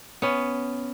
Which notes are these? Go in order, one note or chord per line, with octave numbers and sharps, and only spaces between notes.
B3 C#4